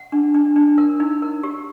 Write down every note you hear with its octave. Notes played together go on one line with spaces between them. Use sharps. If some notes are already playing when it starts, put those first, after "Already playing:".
Already playing: F#5
D4
D4
D4
A#4
D#4
A#4
G4